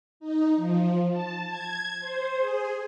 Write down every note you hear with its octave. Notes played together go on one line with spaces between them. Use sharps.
D#4
F3
A5
G#6
C5
G#4